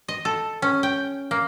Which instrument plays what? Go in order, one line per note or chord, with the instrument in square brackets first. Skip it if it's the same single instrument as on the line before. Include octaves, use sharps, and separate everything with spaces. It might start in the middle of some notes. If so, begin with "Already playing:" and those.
[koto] D#5
A4
C#4
G5
A#3